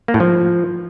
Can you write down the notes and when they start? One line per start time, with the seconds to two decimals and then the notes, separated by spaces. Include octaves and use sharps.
0.08 A#3
0.14 A2
0.20 F3